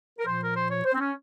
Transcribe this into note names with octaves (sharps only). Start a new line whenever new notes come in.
A#4
A#2 F3 C5
A#4
C5
C#5
C5
C4
C#4